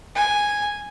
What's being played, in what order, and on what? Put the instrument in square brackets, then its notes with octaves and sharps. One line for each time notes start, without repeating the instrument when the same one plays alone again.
[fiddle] G#5